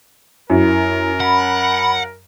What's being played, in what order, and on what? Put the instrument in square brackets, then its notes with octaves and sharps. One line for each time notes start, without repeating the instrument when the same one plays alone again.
[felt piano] F#2 [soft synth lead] E4 [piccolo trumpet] A#4
[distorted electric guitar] F#5 [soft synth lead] B5